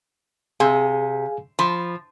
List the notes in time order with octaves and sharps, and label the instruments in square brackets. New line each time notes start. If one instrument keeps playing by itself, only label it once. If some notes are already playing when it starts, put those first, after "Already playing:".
[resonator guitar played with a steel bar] C3 [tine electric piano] G#4 F5 G#5
[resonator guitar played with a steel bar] F3 [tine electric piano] B5